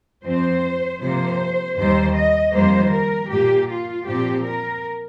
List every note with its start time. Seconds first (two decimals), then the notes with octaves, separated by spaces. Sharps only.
0.24 F2 F3 C4 C5
1.01 C3 F3 A#3 C5
1.77 D#2 D#3 G3 C5
2.15 D#5
2.53 F2 D#3 G3 A#3 C5
2.92 A#4
3.30 A#2 A#3 G4
3.69 F4
4.06 A#2 F3 C4 G4
4.45 A#4